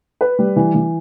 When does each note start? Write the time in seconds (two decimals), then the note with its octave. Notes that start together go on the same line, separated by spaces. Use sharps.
0.21 B4
0.39 G3
0.56 E3
0.75 E3